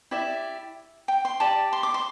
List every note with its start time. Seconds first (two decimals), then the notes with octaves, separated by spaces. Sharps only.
0.11 E4 G4 D5 E5
1.08 G5
1.25 C6
1.40 G4 D5 A5
1.73 C6
1.83 D6
1.94 C6